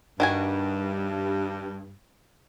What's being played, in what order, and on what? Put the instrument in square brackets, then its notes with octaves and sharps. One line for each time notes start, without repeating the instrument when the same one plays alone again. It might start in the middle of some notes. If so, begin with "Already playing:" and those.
[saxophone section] G2 [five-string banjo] D#3 F#4 G#5